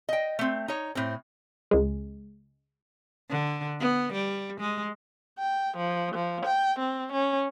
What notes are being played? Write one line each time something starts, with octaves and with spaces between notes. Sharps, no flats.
D#5 G5
A3 C4
D#4 C#5
A2 C4
C#2 G#3
D3
B3
G3
G#3
G5
F3
F3
G5
C4
C#4